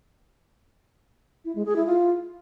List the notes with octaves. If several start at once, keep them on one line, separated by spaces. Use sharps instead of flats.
E4
G#3
G#4
E4
F4